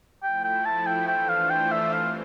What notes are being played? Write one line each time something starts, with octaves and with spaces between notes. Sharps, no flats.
F3 A3 E4 G5
G5
A5
G5
E3 A3 D4 F4 C5 G5
F5
G5
E5
G2 E3 C4 F5